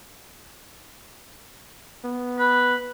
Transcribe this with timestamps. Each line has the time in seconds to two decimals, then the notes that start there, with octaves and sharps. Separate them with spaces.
2.05 B3
2.39 B4